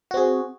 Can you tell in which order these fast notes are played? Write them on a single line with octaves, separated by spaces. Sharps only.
F#4 C4 G#4